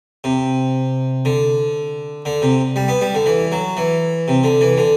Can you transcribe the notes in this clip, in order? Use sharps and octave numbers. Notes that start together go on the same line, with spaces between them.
C3
D3
D3
C3
G3
B3
G3
D3
E3
F#3
E3
C3
D3
E3
D3